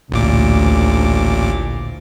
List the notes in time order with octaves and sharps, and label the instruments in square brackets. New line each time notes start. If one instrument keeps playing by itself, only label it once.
[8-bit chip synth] A1 A#2 D6 [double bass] D2